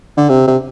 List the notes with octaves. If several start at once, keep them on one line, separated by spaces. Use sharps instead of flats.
D3
C3
C3